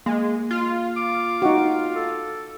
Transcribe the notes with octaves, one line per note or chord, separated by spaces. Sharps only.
G#3 A#3
F4
D6
D#4 F#4
A4